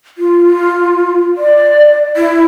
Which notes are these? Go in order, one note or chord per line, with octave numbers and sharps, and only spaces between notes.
F4
D5
E4